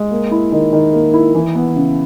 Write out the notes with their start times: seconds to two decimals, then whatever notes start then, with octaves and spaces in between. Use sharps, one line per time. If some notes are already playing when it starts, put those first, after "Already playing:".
Already playing: G#3
0.11 A#3
0.31 E4
0.52 D#3
0.73 D#3
0.93 A#3
1.14 E4
1.35 E3
1.55 B3
1.76 C#3